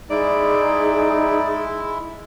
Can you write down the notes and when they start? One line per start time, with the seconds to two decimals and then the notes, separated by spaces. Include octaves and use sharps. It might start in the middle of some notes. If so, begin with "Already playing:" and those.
0.10 G#3 D#4 E4 G#4 D5